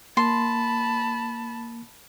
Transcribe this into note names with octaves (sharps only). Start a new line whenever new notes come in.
A#3 A5 B5 C6